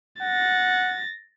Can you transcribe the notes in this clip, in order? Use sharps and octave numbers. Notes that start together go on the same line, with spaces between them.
F#5 A6 A#6